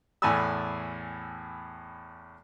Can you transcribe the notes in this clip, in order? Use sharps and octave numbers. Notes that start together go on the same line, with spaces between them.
E2 A2 G#5 A5 B5 E6